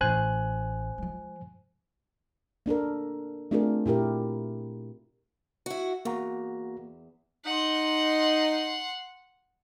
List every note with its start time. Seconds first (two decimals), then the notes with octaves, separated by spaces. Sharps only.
0.01 A1 C5 G#5 F#6
0.98 F3 G#3
2.66 A#3 D4 A4 A#4
3.51 A3 C4 D4 F4 G#4 A#4
3.86 A#2 E4 G4 A#4
5.66 E4 F#4
6.05 E2 A#3 F#4 A#5
7.45 D#4 F#5 C6